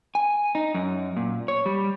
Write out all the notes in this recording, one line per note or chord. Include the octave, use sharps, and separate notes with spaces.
G#5
D#4
F#2
A#2
C#5
G3